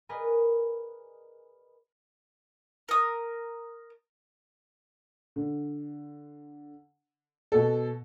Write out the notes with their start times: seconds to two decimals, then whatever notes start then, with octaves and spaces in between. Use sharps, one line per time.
0.09 G#4 A#4 B4 D5 D#5
2.89 A#4 D#6
5.36 D3
7.52 B2 A4